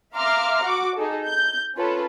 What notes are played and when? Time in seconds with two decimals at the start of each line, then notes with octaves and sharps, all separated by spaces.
0.15 E5 F5 A#5 C6 D6 F6
0.62 F#4 F#5 D6
0.95 D#4 G#4 A4
1.27 G6
1.76 C#4 F4 A4 B4